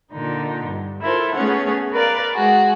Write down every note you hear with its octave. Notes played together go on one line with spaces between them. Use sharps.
A#2 D3 D#4
G2
E4 F4 A4 A#4 C5
A3 B3 C#4 G#4 C#5 F#5
A#4 B4 D5 F5
G#3 F#4 G#4